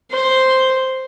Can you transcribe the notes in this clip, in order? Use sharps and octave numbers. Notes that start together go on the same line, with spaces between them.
C5